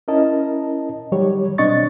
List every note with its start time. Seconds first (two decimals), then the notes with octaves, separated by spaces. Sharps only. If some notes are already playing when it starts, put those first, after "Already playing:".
0.08 C#4 E4 A#4 D#5 A5
1.12 D#3 F#3 G3 G4 C#5
1.58 B2 C4 D4 D#5 C#6 A6